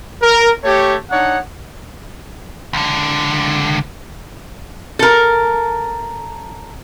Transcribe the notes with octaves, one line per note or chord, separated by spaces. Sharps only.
A#4
A3 G4 C#5
D4 D#4 C#5 F#5
C#2 D3
A4 A#4